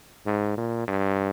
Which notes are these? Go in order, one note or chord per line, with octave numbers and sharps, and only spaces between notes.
G#2
A#2
G2